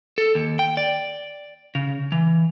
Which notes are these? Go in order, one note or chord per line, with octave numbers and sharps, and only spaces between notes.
A4
D#2
G5
D5
C#3
E3